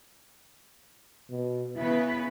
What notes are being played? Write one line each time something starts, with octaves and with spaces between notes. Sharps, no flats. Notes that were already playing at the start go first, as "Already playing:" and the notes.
B2
C#3 B3 E4 B4